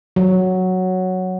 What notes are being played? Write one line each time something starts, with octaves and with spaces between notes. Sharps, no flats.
F#3